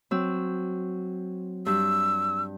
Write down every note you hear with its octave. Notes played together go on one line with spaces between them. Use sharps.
F#3 C4 E6
G2 E6